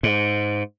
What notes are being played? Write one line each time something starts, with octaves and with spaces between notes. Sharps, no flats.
G#2